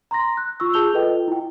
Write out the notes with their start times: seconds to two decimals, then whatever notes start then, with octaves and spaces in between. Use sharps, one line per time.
0.11 A#5 C6 A#6
0.37 F#6
0.60 F4 C#6 E6
0.74 G#4 A5 G6 F7 G7
0.93 F4 A4 B4 D#5 G5
1.28 E4 G5